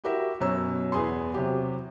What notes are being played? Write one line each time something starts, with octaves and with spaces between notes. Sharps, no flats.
E4 F#4 G4 A#4 E5
F#2 B2 C#4 A#5 E6
E2 B3 G#4 G#5 C6
C3 F#3 G4